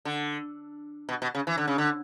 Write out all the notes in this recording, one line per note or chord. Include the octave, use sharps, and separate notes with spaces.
D3
B2
B2
C#3
E3
D3
C#3
D3